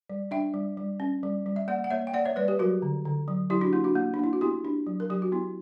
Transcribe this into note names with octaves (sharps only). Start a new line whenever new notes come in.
G3
D4 E5 G5
G3
G3
C#4
G3
G3
E5
A#3 D5 F#5
F#5
A#3 C#5 E5
G5
A#3 D5 F#5
C#5 E5
G3 B4 D5
G4 B4
F#3 F#4 A#4
D3
D3
F#3
F#3 E4 G4
D4 F#4
A#3 E4
D4 F#4
A#3
D4
A#3 E4
F#4
B3 E4 G4
D4
F#3
A#4
F#3 G4
F#4
B3 E4